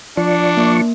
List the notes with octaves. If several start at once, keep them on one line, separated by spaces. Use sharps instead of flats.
F3 D4 D5 C#6
A#3